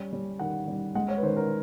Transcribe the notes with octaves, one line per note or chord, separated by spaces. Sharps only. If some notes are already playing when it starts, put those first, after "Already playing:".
Already playing: G3 C#4
G3
D#3 F#5
G3
G#3 F#5
C#5
B4
D#3 C5
A#4